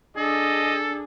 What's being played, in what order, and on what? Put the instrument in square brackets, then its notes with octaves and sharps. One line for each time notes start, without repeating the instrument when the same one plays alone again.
[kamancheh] D4 [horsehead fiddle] G#4 [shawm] A4 [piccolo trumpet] D#5